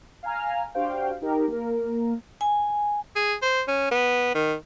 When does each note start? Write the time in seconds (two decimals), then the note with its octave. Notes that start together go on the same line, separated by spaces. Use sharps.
0.23 F5 G#5 A#5 F6
0.74 D4 F#4 G4 C5 F5 G5
1.22 D#4 G4 A#4
1.48 A#3 A#4
2.41 G#5
3.16 G#4
3.42 C5
3.68 C#4
3.91 B3
4.35 D#3